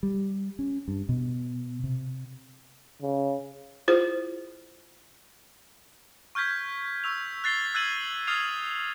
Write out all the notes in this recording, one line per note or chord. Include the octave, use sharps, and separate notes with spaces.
G3
C#4
G2
B2
C3
C#3
E4 F4 G#4 C5
C#6 F6 G6 G#6 B6
C#6 E6 F7
F#6 A6 C7 G7
E6 F#6 G#6 A6 D#7 F#7
D#6 F6 G#6 A6 C7 F7